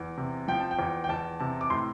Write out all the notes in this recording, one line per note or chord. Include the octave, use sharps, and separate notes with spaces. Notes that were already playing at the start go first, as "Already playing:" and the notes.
Already playing: E2
C3
F3 G5
A5
G5
E2
G5
E2 A5
C3 A5
D6
A2 C6